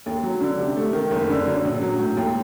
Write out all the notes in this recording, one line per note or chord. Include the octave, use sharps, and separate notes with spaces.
D#2
F#3
D3
C3
A3
D#3
F#1
D3
F#2
A#1
F#3
A2
D#2